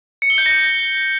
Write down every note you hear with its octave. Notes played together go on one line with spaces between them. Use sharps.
C#7
G7
G6
A#6